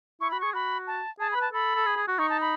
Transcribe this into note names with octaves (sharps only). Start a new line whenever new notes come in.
E4 C#6
F#4 B5
G#4 C#6
F#4 B5
A5
G#4 A5
B5
B4
A5
A4 B5
A4
G#4
G#4
F#4
D#4 C#6
A5
B5